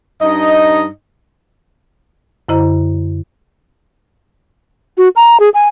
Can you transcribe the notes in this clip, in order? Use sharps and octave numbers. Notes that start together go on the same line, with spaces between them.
G2 D#4 D#5
F#2 D3 E4 C5 D#5 A#5
F#4
A#5
G#4
G#5